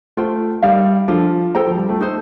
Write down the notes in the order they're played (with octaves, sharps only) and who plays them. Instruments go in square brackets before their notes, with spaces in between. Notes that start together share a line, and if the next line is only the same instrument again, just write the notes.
[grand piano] A3 [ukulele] F4 C5 G5
[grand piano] G3 [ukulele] D#4 A#4 D5 F5
[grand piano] F3 [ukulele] D4 F4 A4
[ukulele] A4 C5 G5 A#5
[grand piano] F3
G3
A3
[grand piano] A3 [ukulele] D#4 A4 C5